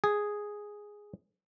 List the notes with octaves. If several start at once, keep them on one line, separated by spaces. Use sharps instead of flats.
G#4